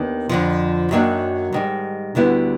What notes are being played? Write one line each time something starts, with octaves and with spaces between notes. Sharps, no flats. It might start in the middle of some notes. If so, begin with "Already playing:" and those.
Already playing: D#2 D#3 B3 D4
F2 D3 F3
F#2 D#3 F#3 A#3 D4
G#2 D#3 G3
D2 D3 G3 B3 E4